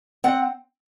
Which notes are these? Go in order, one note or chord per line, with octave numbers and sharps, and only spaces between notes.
C4 F#5